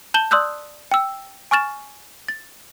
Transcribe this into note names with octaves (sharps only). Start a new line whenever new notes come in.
A5 G6 E7 F#7 G7
D5 C6 D#6 E6 F#6 G6
G5 E6
G#5 C#6 F6 A6 E7
A6